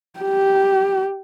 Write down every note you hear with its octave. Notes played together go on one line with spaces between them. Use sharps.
G4